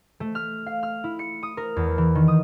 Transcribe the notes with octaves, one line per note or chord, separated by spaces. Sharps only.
A3
F6
F5
F6
E4
C#7
D#6
A#4
E2
E3
D#3
D#6